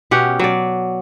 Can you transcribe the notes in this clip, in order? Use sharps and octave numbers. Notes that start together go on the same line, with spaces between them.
B2 C#4 G4 F#5
F#3 D5